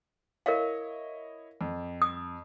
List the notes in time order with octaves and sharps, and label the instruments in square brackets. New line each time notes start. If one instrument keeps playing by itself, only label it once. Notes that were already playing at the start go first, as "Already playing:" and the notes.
[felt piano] E4 C#5 D#5 [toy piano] A#4 F5
[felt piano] F2
[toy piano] D#6